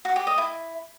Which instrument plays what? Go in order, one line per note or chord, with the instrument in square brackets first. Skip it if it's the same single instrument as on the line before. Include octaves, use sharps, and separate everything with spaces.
[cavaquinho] F#4
G4
D#5
E4